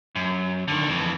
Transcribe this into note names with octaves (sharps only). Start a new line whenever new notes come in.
F#2
D3 D#3
F2 E3